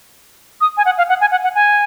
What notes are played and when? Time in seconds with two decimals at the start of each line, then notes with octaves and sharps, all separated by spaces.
0.61 D#6
0.77 G#5
0.85 F#5
0.98 F5
1.09 F#5
1.21 G#5
1.31 F#5
1.44 F#5
1.55 G#5